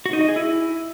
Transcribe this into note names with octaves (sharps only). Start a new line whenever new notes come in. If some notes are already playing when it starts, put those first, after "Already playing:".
F#4
D#4
D#5
G#4
E4